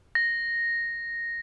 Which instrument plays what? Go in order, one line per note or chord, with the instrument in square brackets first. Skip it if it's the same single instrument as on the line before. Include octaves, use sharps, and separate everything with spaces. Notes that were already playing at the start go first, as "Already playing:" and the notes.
[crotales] A#6